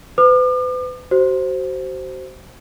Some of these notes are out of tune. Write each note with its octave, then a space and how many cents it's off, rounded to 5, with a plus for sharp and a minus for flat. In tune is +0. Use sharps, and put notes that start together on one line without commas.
B4 +40 D6 +45
F#4 +35 C5 +0